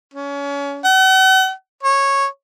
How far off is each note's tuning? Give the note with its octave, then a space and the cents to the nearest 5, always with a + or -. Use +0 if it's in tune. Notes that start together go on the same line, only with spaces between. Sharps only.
C#4 +30
F#5 +40
C#5 -10